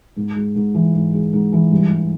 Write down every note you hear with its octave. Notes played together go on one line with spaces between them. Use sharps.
G#2
G#3
G#2
E3
G#2
G#3
G#2
E3
G2
G3